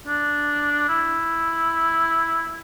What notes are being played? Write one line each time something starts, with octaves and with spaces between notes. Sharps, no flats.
D4
E4